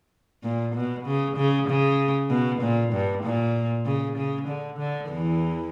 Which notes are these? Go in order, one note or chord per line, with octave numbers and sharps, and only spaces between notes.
A#2
B2
C#3
C#3
C#3
B2
A#2
G2
A#2
C#3
C#3
D3
D3
E2 E3